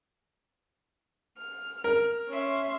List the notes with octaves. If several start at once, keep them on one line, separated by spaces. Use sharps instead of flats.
F6
A#4
C#4 E5 C6